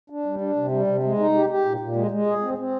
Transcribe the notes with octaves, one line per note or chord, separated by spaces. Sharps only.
D4
G3
D4
C3
G3
C3
G#3
D#4
G4
G4
A#2
A#2
G#3
G#3
G#4
C4
C4